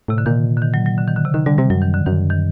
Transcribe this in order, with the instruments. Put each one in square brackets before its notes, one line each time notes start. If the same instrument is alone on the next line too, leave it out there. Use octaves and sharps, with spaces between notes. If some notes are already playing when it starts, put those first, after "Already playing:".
[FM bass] A2 [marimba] C3
[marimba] D3
[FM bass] A#2 [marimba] D#3
[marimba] D3
D#3
F#3
F#3
D3
D#3
D3
C3
[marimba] D3 [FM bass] D#3
[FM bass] D3 [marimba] G3
[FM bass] C3 [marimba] G3
[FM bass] F#2 [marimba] F#3
[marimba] D#3
D3
[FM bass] F#2 [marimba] D#3
[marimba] D#3